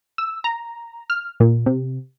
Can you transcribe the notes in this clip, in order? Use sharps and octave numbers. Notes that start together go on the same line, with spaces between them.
E6
A#5
F6
A#2
C3